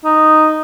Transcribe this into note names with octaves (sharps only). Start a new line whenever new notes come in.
D#4